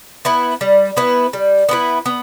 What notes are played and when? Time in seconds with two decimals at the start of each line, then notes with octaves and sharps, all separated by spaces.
0.25 B3 E4 B4
0.61 G3
0.97 B3 E4 B4
1.33 G3
1.69 B3 E4 B4
2.06 B3